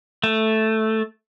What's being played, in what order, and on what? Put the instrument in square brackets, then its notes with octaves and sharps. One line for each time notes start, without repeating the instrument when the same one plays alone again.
[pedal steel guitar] A3